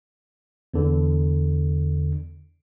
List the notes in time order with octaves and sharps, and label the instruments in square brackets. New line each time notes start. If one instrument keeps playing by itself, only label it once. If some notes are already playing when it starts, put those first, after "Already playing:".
[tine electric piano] E2 D3